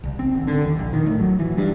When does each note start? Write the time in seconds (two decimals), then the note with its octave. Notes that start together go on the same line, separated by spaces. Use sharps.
0.04 C2
0.19 C4
0.35 G#1
0.47 D3
0.65 D#2
0.79 A#1
0.93 D#3
1.06 A2
1.19 F#3
1.39 E3
1.57 G2